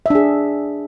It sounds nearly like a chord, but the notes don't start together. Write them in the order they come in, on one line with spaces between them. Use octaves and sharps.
E5 D4 G#4